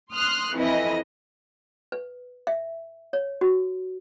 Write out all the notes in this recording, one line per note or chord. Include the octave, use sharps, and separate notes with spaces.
C6 D#6 F6 F#6
F2 E3 E4 D#5
B4
E5
C#5
F#4